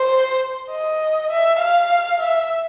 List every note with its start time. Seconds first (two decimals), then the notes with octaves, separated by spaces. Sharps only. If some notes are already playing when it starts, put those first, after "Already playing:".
Already playing: C5
0.70 D#5
1.30 E5
1.59 F5
2.20 E5